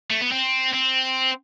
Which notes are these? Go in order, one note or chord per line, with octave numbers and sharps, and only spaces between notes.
A3
B3
C4
C4